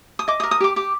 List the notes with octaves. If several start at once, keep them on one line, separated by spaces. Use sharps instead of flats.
D#6
D#5 D6
D#6
A#4
D#6
G4 D6
G4 D6